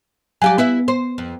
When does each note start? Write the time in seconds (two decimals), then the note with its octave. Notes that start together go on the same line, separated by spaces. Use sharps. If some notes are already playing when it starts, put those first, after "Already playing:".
0.42 F#3 G4 D5 F5 G#5
0.58 B3 E4 B4 E5
0.88 C5
1.18 F2